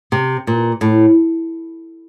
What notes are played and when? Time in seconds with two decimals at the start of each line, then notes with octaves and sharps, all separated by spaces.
0.12 C3
0.47 A#2
0.81 A2